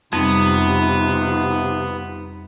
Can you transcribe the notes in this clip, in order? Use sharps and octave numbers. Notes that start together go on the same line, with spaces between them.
F2 C3 G3 B3 C4 D#4 F4